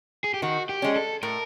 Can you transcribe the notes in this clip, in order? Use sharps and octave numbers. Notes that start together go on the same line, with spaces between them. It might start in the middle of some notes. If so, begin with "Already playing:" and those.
G#4
G4
D#3 F#4
G4
G#3 C#4
A4
A2 A#4